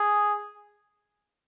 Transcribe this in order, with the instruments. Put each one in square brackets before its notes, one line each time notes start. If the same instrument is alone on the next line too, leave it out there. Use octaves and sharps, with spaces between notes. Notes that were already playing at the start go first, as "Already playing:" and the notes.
Already playing: [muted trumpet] G#4